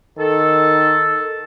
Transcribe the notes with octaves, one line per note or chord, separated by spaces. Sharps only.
D#3 A4